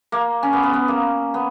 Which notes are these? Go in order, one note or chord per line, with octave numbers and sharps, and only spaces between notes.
A#3
C#4
B3
B3
B3
A#3
B3